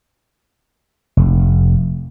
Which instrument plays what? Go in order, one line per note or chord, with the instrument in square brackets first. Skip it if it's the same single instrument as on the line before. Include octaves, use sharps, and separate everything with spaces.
[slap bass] F1